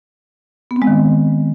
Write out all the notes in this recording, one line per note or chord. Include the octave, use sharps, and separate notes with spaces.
B3
C4
G#3
D#3